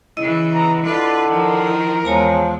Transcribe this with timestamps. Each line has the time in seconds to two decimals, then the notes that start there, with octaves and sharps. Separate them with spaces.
0.17 C#3 E3 E4 D#5
0.54 B3 A#5
0.84 D3 F4 B4 D5
1.28 D#3 F3 A#4
1.67 E4
2.05 E2 F3 G#3 C#5 G#5 A#5